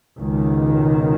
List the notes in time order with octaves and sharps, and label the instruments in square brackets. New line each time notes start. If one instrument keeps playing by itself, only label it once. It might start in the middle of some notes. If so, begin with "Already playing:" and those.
[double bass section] C#2 B2 D#3